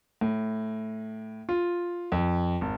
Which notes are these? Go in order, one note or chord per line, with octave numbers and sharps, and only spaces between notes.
A2
F4
F2
G#1